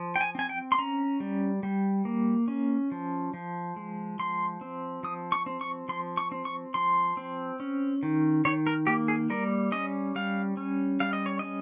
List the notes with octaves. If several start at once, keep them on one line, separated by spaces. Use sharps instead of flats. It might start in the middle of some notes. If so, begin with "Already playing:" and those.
Already playing: F3
G5
G#5
C4 G#5
G5
C6
C#4 A#5
G3
G3
A#3
C#4
F3
F3
G#3
F3 C6
C4
F3 D#6
C#6
C4
C#6
F3 C6
C#6
C4
C#6
F3 C6
C4
C#4
D#3
D#3 C#5
A#4
A#3 G4
G#4
G3 A#4
C#4 D#5
G3 F5
C#4
G3 F5
D#5
C#5
C#4 D#5